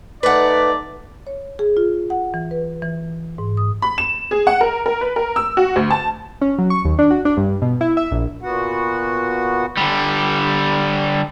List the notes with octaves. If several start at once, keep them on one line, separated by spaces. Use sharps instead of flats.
A3 D#4 B4 D5 F#5
C#5
G#4
F4
F#5
E3
B4
E3
G#2
D#6
B5
E7
G#4
F#5
A#4
A#4
B4
A#4
E6
F#4
D2
A5
C#4
F#3
C#6
D#2
D4
F#4
D4
G2
B2
E4
E5
A#1
A#2 B3 F#4 F#5
D3 G3